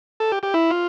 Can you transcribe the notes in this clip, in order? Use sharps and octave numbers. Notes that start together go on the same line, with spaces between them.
A4
G4
G4
E4
F4